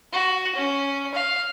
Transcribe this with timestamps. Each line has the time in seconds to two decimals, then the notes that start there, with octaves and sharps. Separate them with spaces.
0.13 F#4
0.55 C#4
1.14 F5